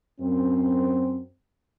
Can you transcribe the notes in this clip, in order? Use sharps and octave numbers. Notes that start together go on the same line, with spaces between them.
F#2 C4